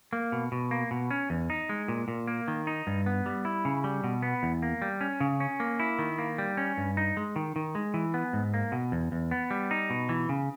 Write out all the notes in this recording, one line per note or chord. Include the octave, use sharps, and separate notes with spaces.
A#3
B2
B2
A#3
B2
C#4
E2
D#4
G#3
A#2
A#2
A#3
D#3
D#4
G2
B3
G3
E4
C#3
G3
B2
B3
E2
A#3
G3
C#4
C#3
C#4
A#3
E4
D#3
A#3
G3
C#4
G2
D#4
G#3
D#3
D#3
G#3
E3
B3
G#2
A#3
B2
E2
E2
B3
G3
D#4
B2
E3
C#3